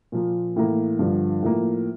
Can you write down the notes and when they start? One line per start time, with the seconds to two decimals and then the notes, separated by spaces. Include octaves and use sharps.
0.12 A#2 F3 A#3
0.56 A2 E3 A#3
0.99 G2 D3 F3
1.42 A2 F3 A#3